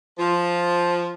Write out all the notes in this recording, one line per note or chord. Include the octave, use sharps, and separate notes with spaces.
F3